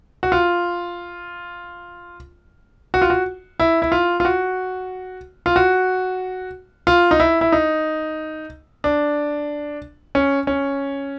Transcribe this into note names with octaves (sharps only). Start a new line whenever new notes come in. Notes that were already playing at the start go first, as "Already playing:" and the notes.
F#4
F4
F#4
F4
F#4
E4
E4
F4
F4
F#4
F4
F#4
F4
D#4
E4
E4
D#4
D4
C#4
C#4